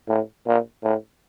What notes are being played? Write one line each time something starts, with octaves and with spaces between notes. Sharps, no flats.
A2
A#2
A2